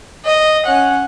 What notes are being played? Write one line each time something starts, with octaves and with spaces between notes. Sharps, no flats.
D#5
C#4 F#5